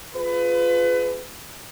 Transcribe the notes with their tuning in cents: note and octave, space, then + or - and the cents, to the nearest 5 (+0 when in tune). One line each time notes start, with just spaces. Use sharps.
F4 +0 G#4 +30 B4 +30